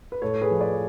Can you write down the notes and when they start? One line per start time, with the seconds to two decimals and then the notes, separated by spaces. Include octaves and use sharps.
0.12 B4
0.22 A2 A4 C#5
0.41 G#4 B4
0.51 F3
0.60 B4 D5